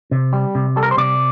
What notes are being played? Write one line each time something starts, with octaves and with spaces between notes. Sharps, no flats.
C3
G3
C3
G3 A4
A#4
C5
C3 D5